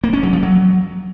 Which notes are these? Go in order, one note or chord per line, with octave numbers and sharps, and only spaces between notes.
A#3
C#4
F#3
F3
F#3